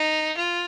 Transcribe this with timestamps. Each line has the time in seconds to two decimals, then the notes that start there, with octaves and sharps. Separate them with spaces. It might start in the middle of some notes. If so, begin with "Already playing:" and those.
Already playing: D#4
0.37 F4